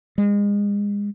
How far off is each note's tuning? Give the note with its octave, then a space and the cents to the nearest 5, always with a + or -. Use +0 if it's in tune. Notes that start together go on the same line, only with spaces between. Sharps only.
G#3 -30